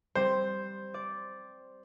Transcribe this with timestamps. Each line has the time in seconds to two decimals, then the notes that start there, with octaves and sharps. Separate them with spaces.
0.15 G3 C4 C5
0.94 D5